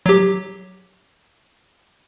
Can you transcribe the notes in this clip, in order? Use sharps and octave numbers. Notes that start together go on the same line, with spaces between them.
F#3 G4